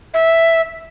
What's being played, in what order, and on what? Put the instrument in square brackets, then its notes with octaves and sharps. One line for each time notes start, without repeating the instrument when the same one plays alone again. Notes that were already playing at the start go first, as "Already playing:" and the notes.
[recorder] E5